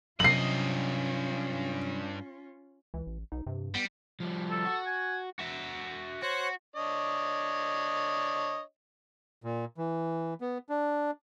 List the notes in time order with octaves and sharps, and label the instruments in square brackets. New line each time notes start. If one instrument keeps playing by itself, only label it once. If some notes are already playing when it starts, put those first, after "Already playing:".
[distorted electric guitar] G2 D#5 [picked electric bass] C3 F#3 [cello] C#4 F4 [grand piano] C7 F#7
[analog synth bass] C#2 [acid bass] E3
[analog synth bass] A1
[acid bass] B1 [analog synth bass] D#4
[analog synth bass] G2 [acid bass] C3
[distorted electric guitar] G3 [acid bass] B3
[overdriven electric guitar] F3 G3
[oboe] A4
[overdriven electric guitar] F#4
[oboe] G#5
[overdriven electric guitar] F#4 E5
[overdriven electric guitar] F#4 [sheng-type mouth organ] C5 C#5 F#6
[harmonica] D4 C#5 D#5
[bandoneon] A#2
E3
B3
D4